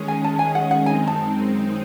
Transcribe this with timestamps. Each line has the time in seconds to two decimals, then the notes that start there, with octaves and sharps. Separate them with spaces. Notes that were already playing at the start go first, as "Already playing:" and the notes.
Already playing: D#3 G#3 C#4 G#4
0.08 G#5
0.24 A5
0.39 G#5
0.55 F#5
0.71 F#5
0.86 F#2 D#3 G#3 C4 D#4 G#5
1.07 A5